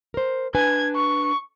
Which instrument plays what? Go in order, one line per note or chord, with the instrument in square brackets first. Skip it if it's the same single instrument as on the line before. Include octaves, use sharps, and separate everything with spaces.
[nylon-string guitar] A#4 C5
[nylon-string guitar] D4 B4 G#5 [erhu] G#6
[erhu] C#6